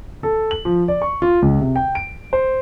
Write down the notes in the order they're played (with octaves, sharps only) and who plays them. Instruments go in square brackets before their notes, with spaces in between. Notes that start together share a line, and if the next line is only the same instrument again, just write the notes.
[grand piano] A4
F#7
F3
D5
C#6
F4
C#2
C3
G5
D7
C5